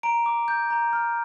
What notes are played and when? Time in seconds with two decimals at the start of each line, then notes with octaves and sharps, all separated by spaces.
0.03 A#5 D7
0.26 D6
0.48 G6
0.70 A#5
0.93 F6